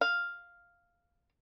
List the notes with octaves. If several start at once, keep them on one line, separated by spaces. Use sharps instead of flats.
F5